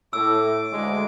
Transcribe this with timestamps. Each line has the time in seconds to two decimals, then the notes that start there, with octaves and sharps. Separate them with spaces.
0.13 A2 D6 E6
0.71 D2 G#3